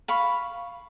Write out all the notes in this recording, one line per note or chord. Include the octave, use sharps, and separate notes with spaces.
F5 B5 C#6